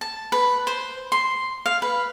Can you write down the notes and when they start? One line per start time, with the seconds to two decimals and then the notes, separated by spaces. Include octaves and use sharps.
0.01 A5
0.32 B4
0.67 C5
1.12 C6
1.66 F5
1.82 B4